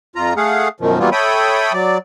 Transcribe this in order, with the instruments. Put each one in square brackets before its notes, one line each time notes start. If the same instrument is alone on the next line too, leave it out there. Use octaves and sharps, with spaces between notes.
[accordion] F2 F4 A#5
A3 G#4 F5 F#5
F#2 B2 D#3 F3
E3 F#3 G3 A#3 B3 F4
A4 C#5 E5 G5 B5 D#6
F#3 D5